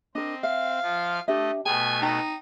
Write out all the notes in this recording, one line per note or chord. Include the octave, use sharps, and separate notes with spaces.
C4 D4 A#4 D#5
E5 F5
F3 F4
A3 D4 G4 D#5 E5
B2 A3 B3 G5 G#5
D#4 G5